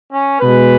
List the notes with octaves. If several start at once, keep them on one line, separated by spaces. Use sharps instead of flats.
C#4
B2 G#3 B4